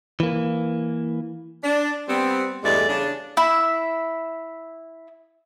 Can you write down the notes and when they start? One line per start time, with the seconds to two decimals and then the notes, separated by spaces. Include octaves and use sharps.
0.20 E3 A#3
1.64 D4
2.09 G3 B3 C4
2.64 E2 G2 G#3 A3 D5
2.89 C#3 D4
3.37 E4 E5